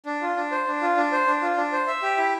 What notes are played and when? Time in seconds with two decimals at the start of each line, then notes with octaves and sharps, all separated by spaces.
0.06 D4
0.22 F4
0.37 D4
0.52 C5
0.67 D4
0.82 F4
0.97 D4
1.12 C5
1.27 D4
1.42 F4
1.57 D4
1.72 C5
1.87 E5
2.03 G4
2.17 E4